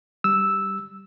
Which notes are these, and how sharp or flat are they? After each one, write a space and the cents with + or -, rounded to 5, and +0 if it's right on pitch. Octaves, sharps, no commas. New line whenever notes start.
G3 +0 E6 -5